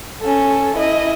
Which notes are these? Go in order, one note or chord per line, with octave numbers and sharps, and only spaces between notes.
C#4 A4
E4 D#5